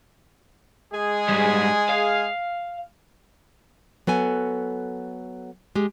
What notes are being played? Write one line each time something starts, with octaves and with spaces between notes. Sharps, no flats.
G#3 G#4
G#2 G3
F5
F#3 B3 A4 G#5
G#3 G4